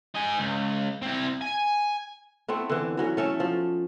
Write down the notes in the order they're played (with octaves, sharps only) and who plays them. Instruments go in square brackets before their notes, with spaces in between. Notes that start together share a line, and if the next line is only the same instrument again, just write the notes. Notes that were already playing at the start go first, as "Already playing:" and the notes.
[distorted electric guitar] D#4 G#5
C#2
C4 E4
G#5
[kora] A3 B3 C4 E4
D3 E3
E3 F#3 C#4
A3 C#4 A4 E5
F3